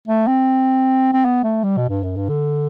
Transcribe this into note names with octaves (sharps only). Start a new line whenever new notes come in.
A3
C4
C4
B3
A3
G3
B2
G2
F#2
G2
D3